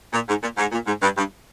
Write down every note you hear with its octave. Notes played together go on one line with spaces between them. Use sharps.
A#2
G#2
A#2
G#2
A#2
G#2
G2
G2